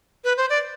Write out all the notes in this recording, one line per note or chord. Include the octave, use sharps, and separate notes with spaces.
B4
C5
D5